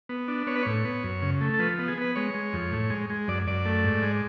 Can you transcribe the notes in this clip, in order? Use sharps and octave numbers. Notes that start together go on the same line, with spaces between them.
B3
D4
B3 C#5
B4
A2 C#5
B3
F#2
C#3
A3
A4
F3 B4
B3
G#4
B3 B4
G#3 C#5
G#3
F2
A2
G#3
G#3
F#2 D5
F#2 D5
A3
G#2
G#3